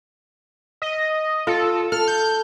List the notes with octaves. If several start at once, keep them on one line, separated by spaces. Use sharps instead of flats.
D#5
F4 A4
A4 F6
G6